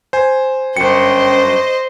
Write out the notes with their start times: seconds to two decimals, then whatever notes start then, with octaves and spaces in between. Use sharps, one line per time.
0.13 C5 G#5
0.77 G1 F#2 C5 D#5 G5 C#7